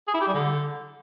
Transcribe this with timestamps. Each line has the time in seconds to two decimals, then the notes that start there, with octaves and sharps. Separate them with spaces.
0.08 G#4
0.14 E4
0.21 G4
0.27 G3
0.34 D3